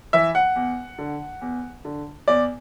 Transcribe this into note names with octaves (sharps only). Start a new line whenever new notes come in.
E3 E5
F#5
E2
D3
E2
D3
E2 D5